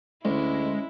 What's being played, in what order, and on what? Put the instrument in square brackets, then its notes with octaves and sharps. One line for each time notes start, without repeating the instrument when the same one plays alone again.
[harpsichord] D2 [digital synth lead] G#3 [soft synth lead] C#4 [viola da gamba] E4